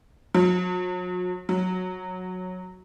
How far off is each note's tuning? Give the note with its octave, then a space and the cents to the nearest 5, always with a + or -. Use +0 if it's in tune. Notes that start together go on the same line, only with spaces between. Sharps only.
F#3 -40
F#3 -10